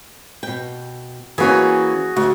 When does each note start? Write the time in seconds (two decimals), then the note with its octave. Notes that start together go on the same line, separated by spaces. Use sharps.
0.43 B2 G5
1.38 E3 A#3 C#4 F#4 G#4
2.16 D2 F#4